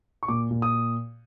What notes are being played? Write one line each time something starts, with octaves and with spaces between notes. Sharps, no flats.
C#6
A#2 D6
A#2
D#6